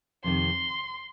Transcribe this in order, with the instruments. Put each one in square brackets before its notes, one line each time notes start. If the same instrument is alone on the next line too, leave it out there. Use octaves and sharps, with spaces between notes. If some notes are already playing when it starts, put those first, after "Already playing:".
[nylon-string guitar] F2 C3 D#3 [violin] C6